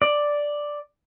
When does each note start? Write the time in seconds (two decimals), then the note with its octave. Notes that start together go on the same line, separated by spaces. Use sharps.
0.02 D5